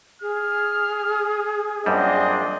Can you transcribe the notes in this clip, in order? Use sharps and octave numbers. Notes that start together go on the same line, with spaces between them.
G#4 F6
F#2 A#2 G3 C4 D4 D#5